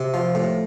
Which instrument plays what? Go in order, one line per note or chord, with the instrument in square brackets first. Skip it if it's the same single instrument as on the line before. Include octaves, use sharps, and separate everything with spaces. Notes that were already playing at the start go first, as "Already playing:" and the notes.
Already playing: [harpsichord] C3
F3
A2